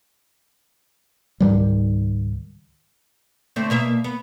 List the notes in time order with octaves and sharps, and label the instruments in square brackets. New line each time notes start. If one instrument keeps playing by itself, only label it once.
[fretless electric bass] C#2 G#2 D#3 G3
[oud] D3 A3 C4
B2 A#3 E5
B3